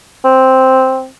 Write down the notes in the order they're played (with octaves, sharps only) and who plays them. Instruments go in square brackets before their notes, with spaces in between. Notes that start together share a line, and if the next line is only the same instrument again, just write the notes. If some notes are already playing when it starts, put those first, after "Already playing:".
[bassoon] C4